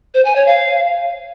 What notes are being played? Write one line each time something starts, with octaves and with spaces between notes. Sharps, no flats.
C5
G#5
C#5
F5